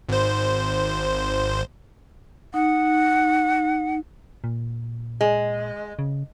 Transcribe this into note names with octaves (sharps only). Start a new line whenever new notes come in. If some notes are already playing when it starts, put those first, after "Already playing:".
G#1 C5
D#4 F#5
A#2
G#3
C#3